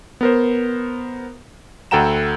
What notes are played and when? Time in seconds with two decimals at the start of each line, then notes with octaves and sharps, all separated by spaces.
0.21 B3 A#4 C5
1.91 D2 A4 F#5 G5 A#5 E7